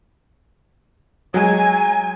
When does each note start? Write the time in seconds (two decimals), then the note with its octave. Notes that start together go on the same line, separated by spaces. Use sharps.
1.34 F#3 G#3 G#5